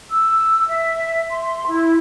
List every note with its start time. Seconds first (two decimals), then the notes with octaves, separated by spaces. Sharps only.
0.10 E6
0.68 E5
1.30 C6
1.66 E4